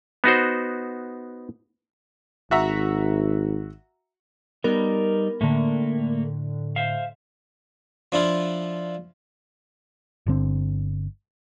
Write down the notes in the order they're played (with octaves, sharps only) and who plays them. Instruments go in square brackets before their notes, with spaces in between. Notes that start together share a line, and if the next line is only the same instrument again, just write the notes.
[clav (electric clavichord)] B3 D#4 F#4 C5
[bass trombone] G#1 [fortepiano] F#4 E5 A#5
[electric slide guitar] G3 D#4 [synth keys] B3 A#4
[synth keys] A2 D3 [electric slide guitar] A3 A#3
[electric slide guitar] C5 E5 F5
[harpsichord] F3 D4 E4 F4
[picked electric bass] G1 D3 C4